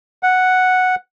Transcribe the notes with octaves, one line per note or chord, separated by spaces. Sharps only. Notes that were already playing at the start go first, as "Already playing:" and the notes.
F#5